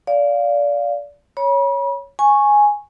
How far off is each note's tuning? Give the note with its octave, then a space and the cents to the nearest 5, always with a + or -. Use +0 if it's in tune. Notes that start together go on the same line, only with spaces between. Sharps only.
D5 -25 F5 +0
C#5 +0 B5 -40
G#5 +0 C#6 -10